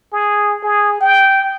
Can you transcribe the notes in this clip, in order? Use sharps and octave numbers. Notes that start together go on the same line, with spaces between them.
G#4
G#4
G5